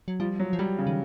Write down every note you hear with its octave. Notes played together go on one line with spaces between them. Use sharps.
F#3
F3 G3
F#3
F3
F#3 G3
C#3
D#3